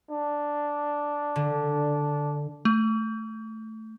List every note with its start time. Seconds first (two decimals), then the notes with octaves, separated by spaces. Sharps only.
0.11 D4
1.36 D3
2.65 A3